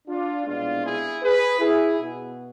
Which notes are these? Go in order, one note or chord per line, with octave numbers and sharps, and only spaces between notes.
D4 F4
C2 B2 G#3 B3 D4 F4
E4 G#4
G#4 B4
E4 G#4
B2 B3